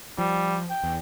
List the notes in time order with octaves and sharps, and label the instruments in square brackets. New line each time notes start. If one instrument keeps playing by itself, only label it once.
[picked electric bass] F3 [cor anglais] G3
[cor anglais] G5
[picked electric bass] E2